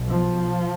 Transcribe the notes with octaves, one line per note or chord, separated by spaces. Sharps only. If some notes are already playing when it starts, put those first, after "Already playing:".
Already playing: B1 B2
F3